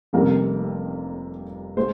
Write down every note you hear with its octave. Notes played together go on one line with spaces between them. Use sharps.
F1 F2 C3 G3 A#4
G#3 C5